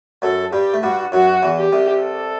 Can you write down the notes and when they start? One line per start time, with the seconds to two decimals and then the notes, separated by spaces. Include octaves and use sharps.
0.22 F#2 F#3 A4
0.53 G2 G3 G4
0.73 A3
0.83 G2 G3 F#4
1.12 F#2 F#3 F#4
1.42 E2 E3
1.58 G4
1.72 C2 C3
2.03 A4